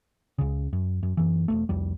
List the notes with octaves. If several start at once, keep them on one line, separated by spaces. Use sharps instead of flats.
C#2 C#3
F#2
F#2
F#2 E3
E1 B1 A3
C2 F2 G3